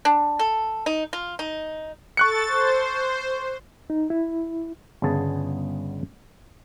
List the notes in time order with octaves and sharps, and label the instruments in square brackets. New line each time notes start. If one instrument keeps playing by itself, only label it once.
[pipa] D4
A4
D#4
F4
D#4
[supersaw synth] A4 A6 [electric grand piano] C#6 F#6 C#7
[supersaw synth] C5
[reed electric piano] D#4
E4
[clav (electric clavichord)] G1 C#3 B3 G#4 A5